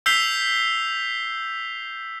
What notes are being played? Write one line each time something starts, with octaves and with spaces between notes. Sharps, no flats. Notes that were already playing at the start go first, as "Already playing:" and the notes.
E6 G6 B6 C7 F7 G7